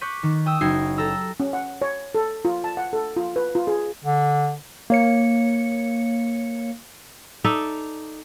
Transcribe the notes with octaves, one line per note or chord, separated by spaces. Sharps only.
C#6 D6 F#6 G6 B6 D#7
D#3
G5 D#6 E6
F#1 D#4 F#4 G5 G#6 C7
G4 A4 A#5 E6
C#4
F#5
C#5
A4
F4
A5
F#5
A4
F4
B4
F4
G#4
D3
A#3 C#5 C#7
D#4 A4 D5 E5